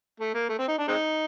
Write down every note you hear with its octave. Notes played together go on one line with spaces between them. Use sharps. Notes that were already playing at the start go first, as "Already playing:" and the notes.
A3
A#3
A3
C4
D#4
D4
G#3 C4 D#4